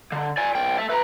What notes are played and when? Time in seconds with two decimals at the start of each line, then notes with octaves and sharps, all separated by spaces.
0.12 D3
0.38 D5 G#5
0.55 B1 G5
0.78 A4 E5
0.90 B4 A#5